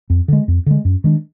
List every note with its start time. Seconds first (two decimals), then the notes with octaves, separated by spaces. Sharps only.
0.10 F2
0.28 D3 G#3
0.48 F2
0.66 D3 G#3
0.85 F#2
1.04 D#3 G#3 D4